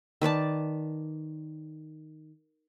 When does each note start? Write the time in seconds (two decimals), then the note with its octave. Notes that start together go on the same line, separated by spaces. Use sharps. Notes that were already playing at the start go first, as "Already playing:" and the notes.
0.22 D#3 B4 D5 A5